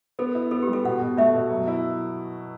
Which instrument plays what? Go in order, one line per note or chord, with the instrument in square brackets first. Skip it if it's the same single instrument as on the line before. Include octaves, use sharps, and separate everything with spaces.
[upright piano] B3 [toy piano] A4
[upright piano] E4
[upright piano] B3 [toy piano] A4
[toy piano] G4
[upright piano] G3
[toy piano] A4
[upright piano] B2 [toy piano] F#5
[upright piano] B2
[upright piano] A3 [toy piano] E5
[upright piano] B2
F#3
E4